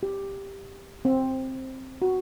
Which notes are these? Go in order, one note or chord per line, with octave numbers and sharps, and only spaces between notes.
G4
C4
F#4